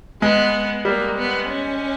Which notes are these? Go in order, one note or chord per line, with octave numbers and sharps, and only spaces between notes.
G#3 B3
G3 A#3
B3
C#4